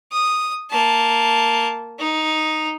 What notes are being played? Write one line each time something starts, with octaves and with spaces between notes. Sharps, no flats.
D#6
A#3 A5
D#4